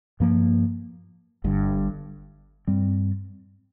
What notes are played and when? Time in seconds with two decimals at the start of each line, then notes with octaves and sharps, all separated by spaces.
0.20 G2 F3 A#3
1.44 G1 G2 D3
2.67 G2 G3 C4